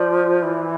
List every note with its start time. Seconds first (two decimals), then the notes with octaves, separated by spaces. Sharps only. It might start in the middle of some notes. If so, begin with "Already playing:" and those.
Already playing: F3 D5
0.42 E3